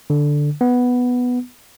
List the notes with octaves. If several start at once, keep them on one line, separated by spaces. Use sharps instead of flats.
D3
B3